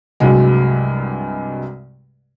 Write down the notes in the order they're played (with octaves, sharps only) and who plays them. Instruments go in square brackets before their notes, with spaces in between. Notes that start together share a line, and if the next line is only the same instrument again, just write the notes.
[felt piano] C2 G2 C3 F#3 G#3